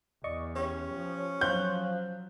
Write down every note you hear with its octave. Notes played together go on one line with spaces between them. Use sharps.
E2 D5 D#5 C#6
C#4 G4 C#5
F3
F3 F#3 C5 F5 F#6 G6